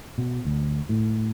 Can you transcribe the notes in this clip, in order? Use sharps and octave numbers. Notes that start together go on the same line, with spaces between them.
B2
D2
A2